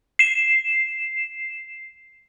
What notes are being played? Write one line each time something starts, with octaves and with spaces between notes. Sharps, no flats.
C7 E7